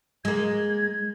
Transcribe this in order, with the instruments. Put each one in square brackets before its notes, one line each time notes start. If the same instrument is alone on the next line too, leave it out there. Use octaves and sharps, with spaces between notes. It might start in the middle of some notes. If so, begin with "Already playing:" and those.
[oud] G#3 A#3 [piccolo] G#6